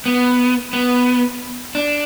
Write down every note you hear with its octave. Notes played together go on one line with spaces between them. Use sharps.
B3
B3
D4